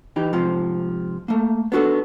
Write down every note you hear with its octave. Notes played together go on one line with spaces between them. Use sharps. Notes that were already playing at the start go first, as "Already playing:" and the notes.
E3 D#4 G4
G#2 C3 F3
A3 A#3
B3 D4 F#4 G4 A4